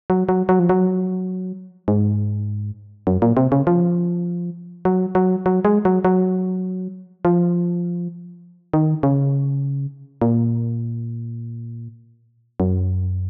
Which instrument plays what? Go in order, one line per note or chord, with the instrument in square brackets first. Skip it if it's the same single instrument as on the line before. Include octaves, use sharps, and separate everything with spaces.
[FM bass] F#3
F#3
F#3
F3
F#3
G#2
F#2
A#2
C3
C#3
F3
F#3
F#3
F#3
G#3
F#3
F#3
F3
D#3
C#3
A#2
F#2